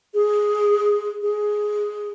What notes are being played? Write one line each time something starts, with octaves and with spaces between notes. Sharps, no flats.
G#4
G#4